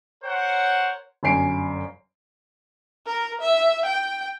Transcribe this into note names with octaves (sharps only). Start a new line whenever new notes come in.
A#4 C5 C#5 F#5
G1 F#2 G#5 C7 D7
A#4
E5
G5